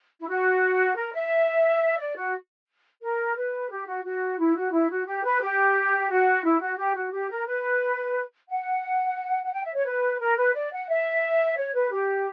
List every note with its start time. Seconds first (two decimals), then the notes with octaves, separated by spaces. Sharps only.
0.21 E4
0.28 F#4
0.96 A#4
1.13 E5
1.98 D5
2.16 F#4
3.02 A#4
3.36 B4
3.70 G4
3.86 F#4
4.05 F#4
4.39 E4
4.56 F#4
4.72 E4
4.90 F#4
5.06 G4
5.24 B4
5.42 G4
6.10 F#4
6.44 E4
6.60 F#4
6.78 G4
6.95 F#4
7.12 G4
7.30 A#4
7.46 B4
8.50 F#5
9.44 F#5
9.52 G5
9.64 E5
9.74 C#5
9.85 B4
10.20 A#4
10.37 B4
10.54 D5
10.72 F#5
10.89 E5
11.57 C#5
11.74 B4
11.92 G4